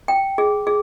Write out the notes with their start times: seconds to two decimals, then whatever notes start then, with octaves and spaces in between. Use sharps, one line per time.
0.08 G5
0.38 G#4
0.67 G#4